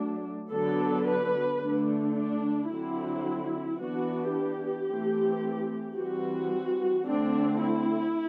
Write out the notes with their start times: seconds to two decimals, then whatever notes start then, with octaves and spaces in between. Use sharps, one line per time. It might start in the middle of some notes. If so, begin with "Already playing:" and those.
Already playing: F#3 A3 D4
0.51 D3 F#3 B3 D4 A4
1.06 B4
1.60 D3 A3 D4
2.15 D4
2.69 D3 F#3 C4 E4
3.79 E3 B3 D4 F#4
4.33 G4
4.87 E3 A3 C4
5.97 E3 G3 C4 F#4
7.05 D3 A3 C4 D4
7.61 E4